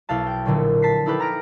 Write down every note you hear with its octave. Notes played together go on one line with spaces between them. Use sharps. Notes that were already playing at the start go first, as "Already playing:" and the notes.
B1 E4 F5 A5
G5
A#1 A#2 D3 F#3
A5 B6 C7
D#4 E4 G4 A4 B4
D#4 A#5 F6 A#6 D7